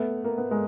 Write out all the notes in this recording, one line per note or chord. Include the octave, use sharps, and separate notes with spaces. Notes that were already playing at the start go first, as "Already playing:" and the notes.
Already playing: A3 B3
A#3
B3
G#3 A#3